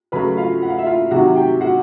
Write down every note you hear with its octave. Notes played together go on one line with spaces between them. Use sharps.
C#3 F#3 A3 B4 B5
F4 F5
F#5
F5
E5
F4 F5
C3 D#3 F#3 F#4 F#5
G4 G5
F#4 F#5